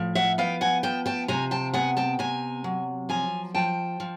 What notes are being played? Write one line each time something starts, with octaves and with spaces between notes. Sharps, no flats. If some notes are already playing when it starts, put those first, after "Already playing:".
Already playing: A2 F3
E5 F#5
B3 F5 G5
F#5 G#5
F3 G5 A5
G5 A5
C3 G#5 A#5
G5 A5
B3 F#5 G#5
G5 A5
C3 G#5 A#5
F#3
F3 G#5 A#5
F3 G5 A5
F3